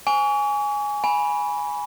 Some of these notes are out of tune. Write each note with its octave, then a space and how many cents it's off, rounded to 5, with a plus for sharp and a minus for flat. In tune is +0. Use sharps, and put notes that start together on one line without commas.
G#5 +0 C#6 +40
G#5 +0 B5 -15